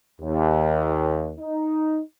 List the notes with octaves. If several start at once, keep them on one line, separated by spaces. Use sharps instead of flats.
D#2
D#4